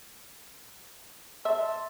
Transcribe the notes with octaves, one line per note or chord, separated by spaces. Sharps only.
E5 A5 C6